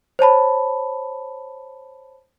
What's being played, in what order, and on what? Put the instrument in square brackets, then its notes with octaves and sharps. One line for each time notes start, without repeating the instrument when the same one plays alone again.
[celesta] C5 C#5 A5 B5